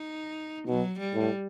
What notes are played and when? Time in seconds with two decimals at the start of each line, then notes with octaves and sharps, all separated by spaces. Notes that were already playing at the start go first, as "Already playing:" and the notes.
Already playing: D#4
0.68 B2 F#3
1.00 G3
1.14 A2